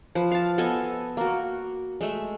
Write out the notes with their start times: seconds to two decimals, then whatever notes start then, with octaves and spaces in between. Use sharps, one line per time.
0.15 F3 B4
0.32 F5 A5
0.58 B3 A4 D#5 G#5
1.17 A#3 F#4
2.01 G#3 A3 E5